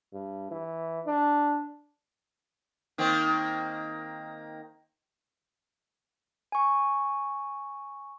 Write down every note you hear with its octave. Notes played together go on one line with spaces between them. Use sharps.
G2
E3
D4
D#3 A#3 C4
G#5 C#6